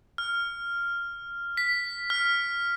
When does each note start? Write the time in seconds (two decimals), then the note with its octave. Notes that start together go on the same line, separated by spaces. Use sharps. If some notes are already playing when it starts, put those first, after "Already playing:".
0.18 F6
1.57 B6
2.10 F6